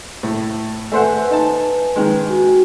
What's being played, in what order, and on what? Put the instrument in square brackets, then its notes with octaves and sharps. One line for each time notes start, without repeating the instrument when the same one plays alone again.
[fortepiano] A2
[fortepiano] A3 C5 F#5 [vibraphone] B4 G#5
[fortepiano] D#4 A5
D#3 G#3
[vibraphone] F#4